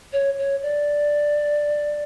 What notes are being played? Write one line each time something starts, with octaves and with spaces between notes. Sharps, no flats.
C#5
C#5
D5